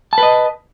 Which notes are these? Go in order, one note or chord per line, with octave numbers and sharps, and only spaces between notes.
B4 D#5 A5